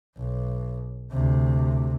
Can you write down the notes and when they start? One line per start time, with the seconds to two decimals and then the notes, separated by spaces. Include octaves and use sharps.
0.17 B1
1.12 D2 C3